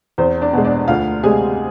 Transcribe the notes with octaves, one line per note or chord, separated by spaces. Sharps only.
E2 C4 C5
D4 D5
B2 G#3
D4 D5
D2 F4 F5
C3 G#3 G#4 G#5